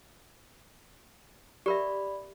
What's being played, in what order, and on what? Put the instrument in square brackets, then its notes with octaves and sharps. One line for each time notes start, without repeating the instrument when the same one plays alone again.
[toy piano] G4 A#4 E5 [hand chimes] D5 B5